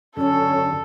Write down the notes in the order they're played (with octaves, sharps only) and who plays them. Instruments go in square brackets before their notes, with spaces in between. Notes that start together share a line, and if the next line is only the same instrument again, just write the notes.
[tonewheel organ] F#2 D3 [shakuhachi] C#4 [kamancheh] A4